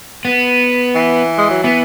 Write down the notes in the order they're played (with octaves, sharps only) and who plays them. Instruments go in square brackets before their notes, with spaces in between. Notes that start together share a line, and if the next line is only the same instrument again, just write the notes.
[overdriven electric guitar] B3
[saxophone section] E3
G#3
F#3
[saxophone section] E3 [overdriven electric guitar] B3